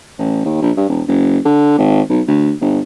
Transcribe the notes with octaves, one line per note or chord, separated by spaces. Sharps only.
A1
D#2
A#1
G2
E1
F#1
D3
G#1
B1
D2
G1